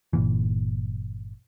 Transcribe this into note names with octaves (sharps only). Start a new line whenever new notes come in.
G1 A#2 E3